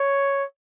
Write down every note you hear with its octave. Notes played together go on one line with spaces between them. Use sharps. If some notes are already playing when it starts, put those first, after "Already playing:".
Already playing: C#5